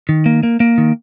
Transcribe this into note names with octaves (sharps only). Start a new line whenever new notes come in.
D#3
A#3
A#3
A#3
D#3